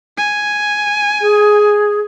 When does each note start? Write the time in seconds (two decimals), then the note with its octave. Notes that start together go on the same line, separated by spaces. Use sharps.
0.18 G#5
1.21 G#4